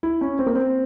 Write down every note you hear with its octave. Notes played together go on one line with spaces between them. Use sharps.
E4
C#4
C4
A#3
C4